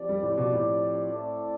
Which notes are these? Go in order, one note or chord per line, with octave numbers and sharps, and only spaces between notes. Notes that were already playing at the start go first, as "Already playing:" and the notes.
Already playing: F3 C4 G4 D5
G3
A2
B2
A2
A3 C4 E4 A4 D5